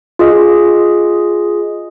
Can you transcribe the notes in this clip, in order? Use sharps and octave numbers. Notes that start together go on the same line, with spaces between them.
F4 G#4 D#5